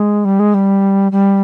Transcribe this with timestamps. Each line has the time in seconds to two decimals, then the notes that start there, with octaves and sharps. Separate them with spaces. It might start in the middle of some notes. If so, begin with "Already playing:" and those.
Already playing: G#3
0.25 G3
0.39 G#3
0.54 G3
1.12 G3